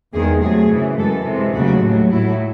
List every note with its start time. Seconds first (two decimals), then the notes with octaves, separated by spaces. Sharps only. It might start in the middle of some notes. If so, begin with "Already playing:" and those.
0.13 E2 D#3 G#3 G#4
0.41 C3 F#3 A3 G#4
0.70 F#2 C#3 E3
0.97 F#2 E3 G#3 A4
1.26 C3 E3 G#3
1.54 D#2 C#3 F#3 A3 F#4
1.82 A2 F#3 A3
2.10 A2 F#3 A3 E4